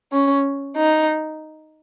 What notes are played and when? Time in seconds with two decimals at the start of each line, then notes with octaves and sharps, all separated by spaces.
0.12 C#4
0.77 D#4